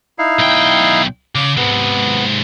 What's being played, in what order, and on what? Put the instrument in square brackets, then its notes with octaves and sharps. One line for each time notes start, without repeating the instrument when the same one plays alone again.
[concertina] D#4 E4 F5
[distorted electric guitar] B1 G5
[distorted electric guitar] C#3 [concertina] D6
[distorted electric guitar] G#2 C3 [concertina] B3